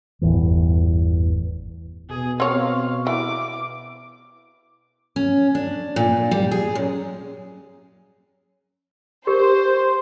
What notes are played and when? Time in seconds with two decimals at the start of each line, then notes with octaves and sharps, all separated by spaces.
0.21 G1 E2 A2 E3
2.10 B2 G#4
2.40 C4 C#5 F5
3.07 E3 D6
5.16 C#4
5.55 D4
5.96 A#2
6.31 G3
6.52 G#4
6.75 F#2
9.27 G4 A#4 C5